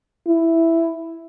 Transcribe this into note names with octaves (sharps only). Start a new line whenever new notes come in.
E4